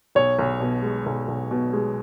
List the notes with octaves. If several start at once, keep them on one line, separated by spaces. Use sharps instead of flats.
B1 C#5
B1
B2
G#3
B1
B1
B2
G#3